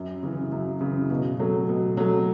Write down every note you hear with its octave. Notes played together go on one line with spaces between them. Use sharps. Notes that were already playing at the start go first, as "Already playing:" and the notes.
Already playing: F#2
C#3 E3
F#2
C#3 E3
B2
F#3 A3
B2
F#3 A3